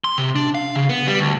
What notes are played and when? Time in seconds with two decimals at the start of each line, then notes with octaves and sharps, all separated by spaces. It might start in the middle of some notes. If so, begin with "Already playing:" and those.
0.04 C6
0.18 C3
0.36 D4
0.55 F5
0.76 C#3
0.89 B3
1.08 G3
1.20 D2